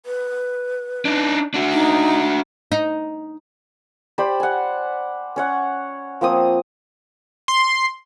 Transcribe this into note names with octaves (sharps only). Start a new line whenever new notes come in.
B4
D4 D#4
D4 F#4
D#4
D#4
G4 C5 D5 B5
F#5 G#5
C#4 C#5 F#5
F3 A#3 C4 D#6
C6